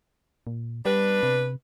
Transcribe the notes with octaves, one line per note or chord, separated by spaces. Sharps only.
A#2
G3 B3 D4 B4
C3